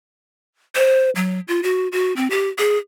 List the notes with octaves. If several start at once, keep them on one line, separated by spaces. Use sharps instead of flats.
C5
F#3
F4
F#4
F#4
C4
G4
G#4